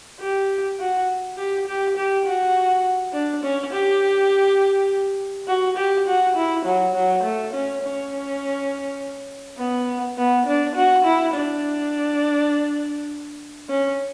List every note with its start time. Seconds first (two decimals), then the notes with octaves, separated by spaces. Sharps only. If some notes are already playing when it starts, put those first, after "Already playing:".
0.20 G4
0.79 F#4
1.37 G4
1.67 G4
1.97 G4
2.25 F#4
3.13 D4
3.44 C#4
3.73 G4
5.48 F#4
5.77 G4
6.07 F#4
6.36 E4
6.65 F#3
6.95 F#3
7.23 A3
7.54 C#4
7.82 C#4
9.58 B3
10.18 B3
10.46 D4
10.76 F#4
11.05 E4
11.34 D4
13.69 C#4